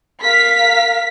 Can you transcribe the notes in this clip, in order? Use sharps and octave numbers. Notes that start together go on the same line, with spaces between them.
A#4 F5 B6